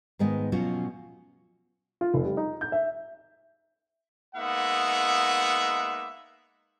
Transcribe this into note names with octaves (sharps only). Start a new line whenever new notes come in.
G#2 D#3 G#3 B3 D#5
B2 F3 F#3 C#4 F4 F#4
F4
F1
G3
D#4
G6
E5
G#3 A#3 B3 D#4 E5 F#5